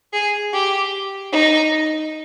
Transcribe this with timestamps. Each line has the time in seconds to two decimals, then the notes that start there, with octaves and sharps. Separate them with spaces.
0.13 G#4
0.53 G4
1.32 D#4